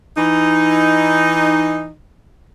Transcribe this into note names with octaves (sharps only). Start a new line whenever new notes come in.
E3 D#4